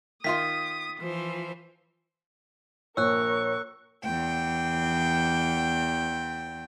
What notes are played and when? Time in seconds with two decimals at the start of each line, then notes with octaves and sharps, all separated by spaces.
0.24 D#3 F4 C6 D#6 B6
0.99 E3 F3 C5
2.97 A#1 A#4 C#5 C#6 E6 F#6
4.04 E2 G5